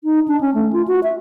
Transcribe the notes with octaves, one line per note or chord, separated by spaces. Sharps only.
D#4
D4
C#4
A3
F4
F#4
E5